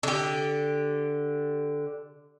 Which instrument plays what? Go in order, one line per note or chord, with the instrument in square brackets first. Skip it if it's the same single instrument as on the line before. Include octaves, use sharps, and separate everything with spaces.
[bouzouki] D3 G4